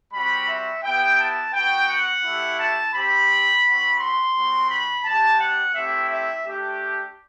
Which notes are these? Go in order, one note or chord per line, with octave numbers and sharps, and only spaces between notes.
G3 C4 F#4 B5
E5
B3 E4 G4 G5
A5
B3 F#4 G5
F#5
A3 E4 G4
A5
C4 G4 B5
C4 F#4
C6
G3 C4 F#4
B5
G3 D4 G4 A5
F#5
A3 C4 E4 G4 E5
E5
A3 D4 G4